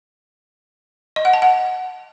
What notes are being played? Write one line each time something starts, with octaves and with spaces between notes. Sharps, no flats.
D#5
F#5
A5
F#5